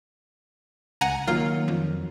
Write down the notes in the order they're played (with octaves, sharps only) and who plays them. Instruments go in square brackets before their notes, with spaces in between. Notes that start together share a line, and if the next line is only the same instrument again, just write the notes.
[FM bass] C#2 [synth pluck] F#5 G#5 A#5
[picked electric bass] D#3 F#3 [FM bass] A#3 [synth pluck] F4
[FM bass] F2